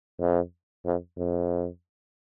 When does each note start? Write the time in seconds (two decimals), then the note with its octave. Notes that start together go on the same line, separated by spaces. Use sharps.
0.20 F2
0.85 F2
1.18 F2